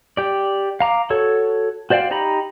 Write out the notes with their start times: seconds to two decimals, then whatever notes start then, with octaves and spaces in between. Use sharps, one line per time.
0.17 G4 D5
0.80 F5 A#5 D6
1.10 F#4 A4 C#5
1.90 F#4 C5 D5 F5 G5
2.11 D#4 G4 A#5 B5